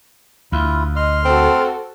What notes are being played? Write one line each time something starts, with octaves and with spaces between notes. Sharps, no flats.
D2 E4 F4
D#5 C6 F6
C4 F#4 A4